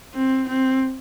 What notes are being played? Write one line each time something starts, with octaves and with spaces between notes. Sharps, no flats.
C4
C4